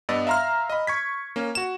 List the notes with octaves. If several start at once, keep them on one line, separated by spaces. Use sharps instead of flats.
G2 B3 D5 D#5 E6
E5 F5 A#5 C6 F6
D#5 B5
C#6 G#6 B6
A#3 C#4
F#4 E7